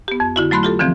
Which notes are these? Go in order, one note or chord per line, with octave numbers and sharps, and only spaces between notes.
B3 G4
F2
D3 E4 F#4
F#3 A3 B5 C6 F#6
F4 G4 A4
D3 E3 F3 C4